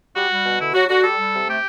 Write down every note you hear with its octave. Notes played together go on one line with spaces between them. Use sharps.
G3 F#4
G3
B2
D3 E4
F#3 F#4
D3 F#4
G3 A4
G3
C3
A3 G4